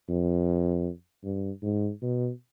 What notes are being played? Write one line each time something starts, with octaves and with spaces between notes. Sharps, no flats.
F2
G2
G#2
B2